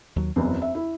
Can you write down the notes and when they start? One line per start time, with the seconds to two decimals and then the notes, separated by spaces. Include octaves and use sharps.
0.16 D#2 F#3
0.36 F#1 E2 C4
0.62 E5
0.75 E4